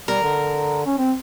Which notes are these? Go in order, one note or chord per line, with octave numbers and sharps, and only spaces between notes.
G3 A#4
D3
C#4
C4